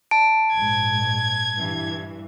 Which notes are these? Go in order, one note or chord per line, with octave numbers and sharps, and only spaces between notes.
A5 D7
A#1 G#2 G#6
G2 E3